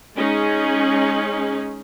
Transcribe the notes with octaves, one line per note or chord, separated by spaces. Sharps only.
G#3 C#4 D#4 G#4